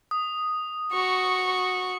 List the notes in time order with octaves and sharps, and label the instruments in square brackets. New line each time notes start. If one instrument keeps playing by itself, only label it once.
[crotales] D#6
[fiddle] F#4 C#6